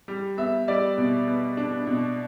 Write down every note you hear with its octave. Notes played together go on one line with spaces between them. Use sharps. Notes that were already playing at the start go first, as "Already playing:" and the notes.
G3
B3 E5
G3 D5
B2
B3
D4
B2